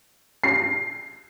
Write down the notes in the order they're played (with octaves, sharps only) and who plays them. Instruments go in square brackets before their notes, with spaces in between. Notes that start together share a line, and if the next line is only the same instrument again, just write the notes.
[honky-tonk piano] C7